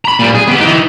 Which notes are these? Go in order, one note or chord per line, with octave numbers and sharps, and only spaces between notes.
A#5 B5
A#2 G3
G#4
B3 G4
E3 D#4